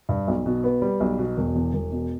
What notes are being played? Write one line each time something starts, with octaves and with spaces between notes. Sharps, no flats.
G2
B1
B2
B3
G3
B1
B2
E1
E2
E1
B2